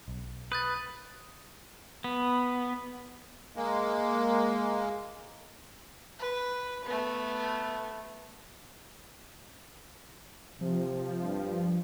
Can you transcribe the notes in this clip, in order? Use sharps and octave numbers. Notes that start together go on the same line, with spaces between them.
B1
B4 D#6 G6 A6
B3
G#3 A#3
B4
A3 B3
C3 F3
G2